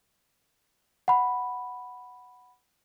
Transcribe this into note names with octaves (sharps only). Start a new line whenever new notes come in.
F#5 B5